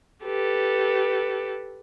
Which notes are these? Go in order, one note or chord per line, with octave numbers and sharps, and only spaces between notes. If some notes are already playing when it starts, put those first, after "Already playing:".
G4 A4 B4